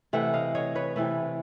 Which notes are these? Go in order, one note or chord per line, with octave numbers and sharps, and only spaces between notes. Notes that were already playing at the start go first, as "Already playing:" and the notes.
C3 E3 A3 E5 F#5
D#5 F5
C#5 D#5
B4 C#5
C3 E3 A3 A4 B4